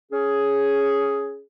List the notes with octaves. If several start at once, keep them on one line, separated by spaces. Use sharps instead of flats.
C#4 G#4